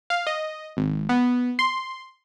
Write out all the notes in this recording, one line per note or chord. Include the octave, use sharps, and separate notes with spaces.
F5
D#5
G#1
B3
C6